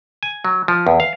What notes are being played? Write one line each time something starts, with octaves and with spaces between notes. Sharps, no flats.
G#5
F#3
F3
E2
F5